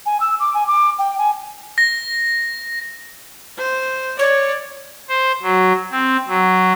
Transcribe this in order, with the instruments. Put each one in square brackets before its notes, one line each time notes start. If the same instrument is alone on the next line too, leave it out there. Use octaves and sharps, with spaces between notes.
[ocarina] G#5
E6
D6
G#5
D6
G5
G#5
[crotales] A#6
[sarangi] C5
[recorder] C#5 [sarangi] D5
[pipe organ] C5
F#3
C4
F#3